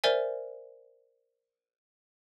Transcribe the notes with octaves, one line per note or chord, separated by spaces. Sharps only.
A#4 C5 D5 E5 G#5